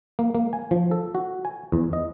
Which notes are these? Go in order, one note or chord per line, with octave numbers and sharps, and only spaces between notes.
A#3
A#3
G#5
F3
A4
F#4
G#5
E2
D#5